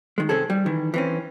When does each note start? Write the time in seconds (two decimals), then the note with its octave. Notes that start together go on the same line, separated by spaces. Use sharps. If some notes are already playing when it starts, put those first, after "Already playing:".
0.18 D#3 G#3
0.29 C3 D#3 C4 C#4 G#4 A4
0.50 G3
0.66 D#3 E3
0.94 E3 C4 C#4